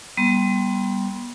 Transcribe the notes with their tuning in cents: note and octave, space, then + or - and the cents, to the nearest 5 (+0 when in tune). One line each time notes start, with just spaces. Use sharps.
G3 +0 B3 -30 C6 +0